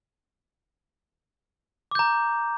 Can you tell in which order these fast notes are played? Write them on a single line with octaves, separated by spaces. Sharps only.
D6 G6 A#5